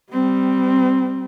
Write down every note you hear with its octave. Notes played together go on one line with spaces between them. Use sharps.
G3 C4